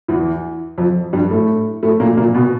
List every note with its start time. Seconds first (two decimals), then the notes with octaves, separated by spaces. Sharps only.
0.08 E2 E3
0.78 F2 F3
1.13 G2 G3
1.31 A2 A3
1.83 A2 A3
2.00 A#2 A#3
2.17 A#2 A#3
2.35 B2 B3